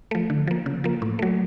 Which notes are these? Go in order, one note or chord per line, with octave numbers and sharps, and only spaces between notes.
F3 A3
D3
F3 A#3
C#3
F3 A#3
A2
F#3 A3